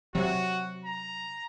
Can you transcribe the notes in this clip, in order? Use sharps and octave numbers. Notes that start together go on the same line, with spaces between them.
C3 F#3 F#4
A#5